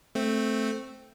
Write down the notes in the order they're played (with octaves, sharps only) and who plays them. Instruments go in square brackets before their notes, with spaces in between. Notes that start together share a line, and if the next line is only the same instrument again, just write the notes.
[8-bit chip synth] A3 C4